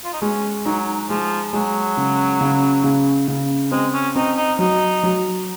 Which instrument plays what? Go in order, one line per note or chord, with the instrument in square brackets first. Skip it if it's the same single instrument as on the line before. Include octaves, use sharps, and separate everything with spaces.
[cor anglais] F4
D#4
[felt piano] G#3 [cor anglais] C#4
[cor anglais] F#3 [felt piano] D#4
[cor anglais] F3 [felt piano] G#3
[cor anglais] F#3 [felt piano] G#3
[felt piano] C#3
C#3
C#3
C#3
[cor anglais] G#3 [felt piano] C4
[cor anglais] C#4
[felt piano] C4 [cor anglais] D#4
[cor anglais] D#4
[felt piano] F#3 [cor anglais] D#4
[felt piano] F#3